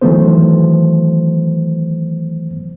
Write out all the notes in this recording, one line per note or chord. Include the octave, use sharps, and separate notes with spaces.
D#3 E3 F#3 A3 B3 C5